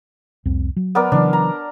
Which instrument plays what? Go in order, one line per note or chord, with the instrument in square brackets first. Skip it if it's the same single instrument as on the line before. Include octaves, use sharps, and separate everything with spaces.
[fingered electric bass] C2 F2 C4
F#3
[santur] B3 A#4 D5
[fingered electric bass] C#3 E3 F#3 [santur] D4
[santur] A#5